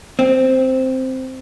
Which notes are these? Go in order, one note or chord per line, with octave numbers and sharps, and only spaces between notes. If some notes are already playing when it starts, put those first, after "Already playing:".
C4